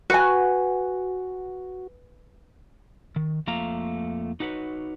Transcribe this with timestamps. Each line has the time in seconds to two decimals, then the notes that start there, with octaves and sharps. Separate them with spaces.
0.10 F#4 B4 G#5
3.16 D#3
3.47 F2 F3 A3 A#3 F5 A#5
4.40 D#4 F#4 B4 C#5